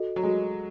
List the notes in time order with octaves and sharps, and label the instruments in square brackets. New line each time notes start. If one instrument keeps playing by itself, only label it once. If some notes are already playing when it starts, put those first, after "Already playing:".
Already playing: [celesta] F#4 A4 D#5
[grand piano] F#3
[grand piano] G#3 [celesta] F#4 A4 D#5